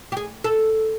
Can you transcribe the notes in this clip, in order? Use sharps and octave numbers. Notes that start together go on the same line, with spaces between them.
G4
G#4
A4